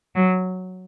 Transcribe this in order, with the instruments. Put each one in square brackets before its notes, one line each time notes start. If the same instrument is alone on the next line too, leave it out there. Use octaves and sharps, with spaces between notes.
[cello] F#3